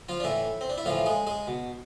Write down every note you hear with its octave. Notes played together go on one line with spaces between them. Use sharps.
F3 F4
D4
A2 E3 E4
C4
D4
E4
A2 E3 F3 F4
G#3 G#4
G#3 G#4
B2